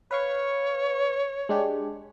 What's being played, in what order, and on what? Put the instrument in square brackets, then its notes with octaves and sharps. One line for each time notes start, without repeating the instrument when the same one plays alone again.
[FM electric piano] B4 F5 C#6 [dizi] C#5
[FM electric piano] G#3 D4 G4